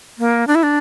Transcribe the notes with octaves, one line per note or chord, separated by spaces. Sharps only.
A#3
D4
E4
D4